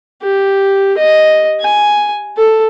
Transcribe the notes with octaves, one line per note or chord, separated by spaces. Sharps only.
G4
D#5
G#5
A4